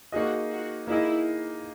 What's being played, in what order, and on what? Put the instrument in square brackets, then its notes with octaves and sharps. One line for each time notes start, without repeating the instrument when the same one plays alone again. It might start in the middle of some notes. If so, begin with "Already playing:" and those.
[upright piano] A#3 D#4 G#4 D#5 [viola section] F#4
[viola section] F#4
[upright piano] A#3 D#4 G#4 D#5 [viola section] E4